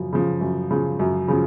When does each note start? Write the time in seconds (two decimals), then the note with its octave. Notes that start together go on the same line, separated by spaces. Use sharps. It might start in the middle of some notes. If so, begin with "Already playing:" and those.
Already playing: F#2 C#3 F3
0.13 C#3 F3
0.41 F#2
0.71 C#3 F3
0.99 F#2
1.28 C#3 F3